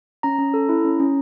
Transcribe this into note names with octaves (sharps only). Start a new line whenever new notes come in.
C#4 A#5
C#4
A4
E4
C#4
C#4